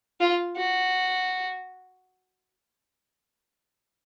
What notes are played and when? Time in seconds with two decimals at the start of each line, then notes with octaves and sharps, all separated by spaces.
0.20 F4
0.56 F#4